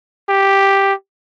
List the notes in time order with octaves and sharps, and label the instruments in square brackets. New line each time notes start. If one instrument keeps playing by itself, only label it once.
[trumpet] G4